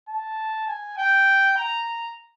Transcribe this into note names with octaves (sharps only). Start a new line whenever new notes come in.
A5
G#5
G5
A#5